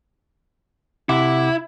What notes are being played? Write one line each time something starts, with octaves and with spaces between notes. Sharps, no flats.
C3 E4 F#5 D6